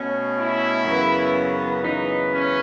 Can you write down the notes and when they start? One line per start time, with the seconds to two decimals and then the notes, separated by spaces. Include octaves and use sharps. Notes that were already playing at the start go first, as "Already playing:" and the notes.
Already playing: B2 A3 C#4
0.36 E4
0.84 F#2 C#3 E3 B3
1.83 F#2 C#3 E3 B3 D#4
2.32 C#4